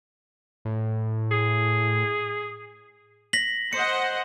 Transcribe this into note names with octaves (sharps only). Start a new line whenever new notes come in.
A2
G#4
A#6 B6 F#7
C5 D#5 F#5 C#7